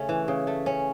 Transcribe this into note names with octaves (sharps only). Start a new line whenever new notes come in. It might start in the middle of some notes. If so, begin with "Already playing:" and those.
Already playing: C#3 A3 C#4
E3
C#3
A3
C#4